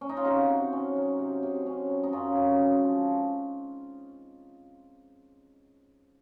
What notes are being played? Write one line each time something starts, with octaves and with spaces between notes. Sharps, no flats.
C#4
D#4
F4
C3 D#4 F#4
C3
C#4
F#3
C3
C3
C#4
F#3
D#4
F#2 C#4 F4
F#2
G#3
F3